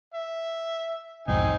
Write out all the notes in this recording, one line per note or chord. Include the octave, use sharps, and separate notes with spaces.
E5
B1 F2 G#2 C4 D#4 G#5